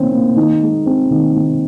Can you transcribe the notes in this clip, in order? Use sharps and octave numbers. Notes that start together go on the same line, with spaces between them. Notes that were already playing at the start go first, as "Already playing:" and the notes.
Already playing: D#3 A#3 C4 C#4
A#3
D#3 D#4
G#3
C4
D#3
D#3